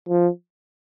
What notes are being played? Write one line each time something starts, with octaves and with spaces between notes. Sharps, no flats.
F3